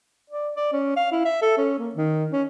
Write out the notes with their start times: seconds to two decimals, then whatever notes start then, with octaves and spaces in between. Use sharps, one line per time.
0.30 D5
0.56 D5
0.73 C#4
0.96 F5
1.12 E4
1.25 E5
1.42 A4
1.58 C#4
1.79 A#3
1.95 D#3
2.32 C#4